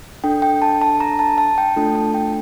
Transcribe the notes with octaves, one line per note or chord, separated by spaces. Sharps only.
D4 A4 G5
G5
A5
A5
A#5
A5
A5
G5
A3 D4 F4 A4 A5
A5
G5